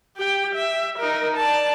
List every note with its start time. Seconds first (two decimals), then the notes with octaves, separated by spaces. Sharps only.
0.17 G4 G5
0.55 E5
0.98 D#4 A#4
1.37 D5 A5